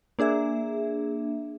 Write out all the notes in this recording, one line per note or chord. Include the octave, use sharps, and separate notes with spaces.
A#3 D4 G#4 E5